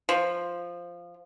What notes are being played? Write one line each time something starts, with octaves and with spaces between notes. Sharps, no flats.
F3